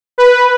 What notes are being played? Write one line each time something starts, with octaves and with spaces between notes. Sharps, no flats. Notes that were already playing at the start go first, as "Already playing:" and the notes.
B4